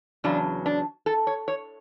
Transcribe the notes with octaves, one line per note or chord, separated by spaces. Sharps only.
E2 C#3 F#3 D4
D4
A4
C#5
C#5